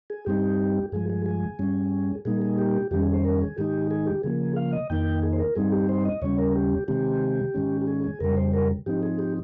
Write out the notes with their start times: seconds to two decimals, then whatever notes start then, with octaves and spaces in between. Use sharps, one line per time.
0.10 G#4
0.26 G2 G3 C4 D#4 G4
0.92 G2 F3 G#3 G#4
1.10 G#4
1.26 G#4
1.59 G2 G3 C#4
2.25 A#2 G3 A#3 D#4 G#4
2.42 G#4
2.58 G4
2.91 F2 D#3 G3 C#4 G4
3.02 G#4
3.14 C5
3.25 A#4
3.41 G#4
3.58 G#2 D#3 G#3 D#4 G4
3.91 G#4
4.07 G4
4.23 C#3 F3 A#3 G#4
4.56 F5
4.73 D#5
4.90 F2 D#3 A#3 D#4 G5
5.23 G#4
5.33 C5
5.39 A#4
5.55 G2 G3 C4 D#4 G#4
5.72 G4
5.89 C5
6.05 D#5
6.22 D#2 C#3 G3 C#4 C#5
6.38 A#4
6.55 G4
6.88 C3 D#3 G#3 C4 G4
7.54 G#2 D#3 G#3 C#4
7.81 G4
7.87 G#4
8.04 G#4
8.20 F2 C#3 G3 A#4
8.37 C5
8.53 A#4
8.86 G#2 F3 C4 D#4 G4
9.03 G#4
9.19 G4